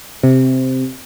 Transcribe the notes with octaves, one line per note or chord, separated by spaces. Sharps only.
C3